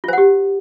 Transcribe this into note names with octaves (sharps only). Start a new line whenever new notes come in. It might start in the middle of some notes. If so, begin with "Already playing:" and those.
F4 G4 C5 F#5